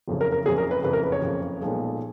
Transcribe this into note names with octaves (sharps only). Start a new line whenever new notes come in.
F#1 F2 C#3
A#4
A#4
F#1 F2 C#3 G#4
A#4
B4
F#1 F2 C#3 B4
A#4
B4
C#5
F#1 F2 C#3
B1 A#2 F3 G#3